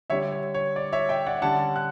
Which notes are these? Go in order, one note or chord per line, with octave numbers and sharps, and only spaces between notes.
D3 G3 D4 C#5 E5
C#5
C#5
D5
C#5 E5
E5 G5
D5 F#5
D3 G3 C#4 F#5 A5
F#6